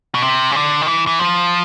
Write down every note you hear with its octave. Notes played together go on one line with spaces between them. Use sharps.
B2
C3
C#3
D3
D#3
E3
E3
F3